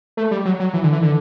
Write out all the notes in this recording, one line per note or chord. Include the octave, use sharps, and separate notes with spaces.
A3
G3
F#3
F#3
E3
D3
E3
D3